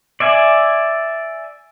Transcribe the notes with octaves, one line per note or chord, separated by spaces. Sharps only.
D5 E5 G#5